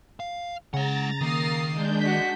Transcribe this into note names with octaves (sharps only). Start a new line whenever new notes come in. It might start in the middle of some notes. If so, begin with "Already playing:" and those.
F5
C#3 G#3 F#5 A#5 A6
D#3 A#3 D#6 C7
G#3 D4 G6
F#4 B6